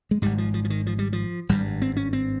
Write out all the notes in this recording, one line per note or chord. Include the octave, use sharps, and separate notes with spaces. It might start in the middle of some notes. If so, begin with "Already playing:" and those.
G#3
G#1 G#2 G3
F3
F3
F3
D#3
F3
G3
F3
G#1 G2 G3
C4
C#4
C4